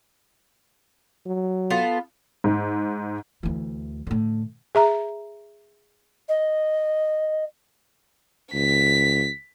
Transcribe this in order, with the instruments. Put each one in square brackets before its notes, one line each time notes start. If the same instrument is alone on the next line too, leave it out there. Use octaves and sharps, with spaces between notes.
[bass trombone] F#3
[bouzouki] B3 F4 A4
[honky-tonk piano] G#2
[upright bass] D2 E3
A2 D3
[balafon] G#4 E5 A#5
[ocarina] D#5
[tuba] C#2 [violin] B6